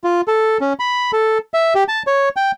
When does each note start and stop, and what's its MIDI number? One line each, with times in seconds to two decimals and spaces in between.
0.04 0.21 65
0.28 0.58 69
0.61 0.73 61
0.79 1.11 83
1.13 1.38 69
1.54 1.74 76
1.75 1.84 67
1.88 2.03 81
2.07 2.29 73
2.36 2.51 79